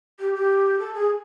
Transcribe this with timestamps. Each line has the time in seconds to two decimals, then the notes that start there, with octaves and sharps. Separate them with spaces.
0.20 G4
0.34 G4
0.79 A4
0.94 G#4